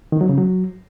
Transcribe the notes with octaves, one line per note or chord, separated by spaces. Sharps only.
D#3
F#3
C#3
F#3